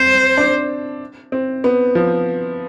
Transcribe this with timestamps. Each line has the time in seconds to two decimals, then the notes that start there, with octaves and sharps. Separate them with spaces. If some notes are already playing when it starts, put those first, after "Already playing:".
Already playing: C4 C5
0.37 D4
1.32 C4
1.64 B3
1.95 F3